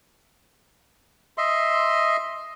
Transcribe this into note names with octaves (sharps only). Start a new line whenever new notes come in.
D#5 E5 C6